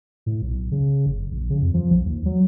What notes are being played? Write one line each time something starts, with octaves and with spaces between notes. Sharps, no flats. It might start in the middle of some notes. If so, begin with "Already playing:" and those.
A2
B1
C#3
F#1
A#1
C#3
F2
F3
B1
D#2
F#3